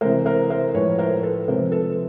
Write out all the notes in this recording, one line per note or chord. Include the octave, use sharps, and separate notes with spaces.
C3 E3 G#3 A#4 C5
A#4 C5
A#4 C5
A2 F3 G#3 B4 C#5
A#4 C5
A4 B4
C3 F3 G#3 A#4 C5
A4 B4